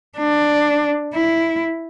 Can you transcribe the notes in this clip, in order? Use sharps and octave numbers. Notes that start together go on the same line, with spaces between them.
D4
E4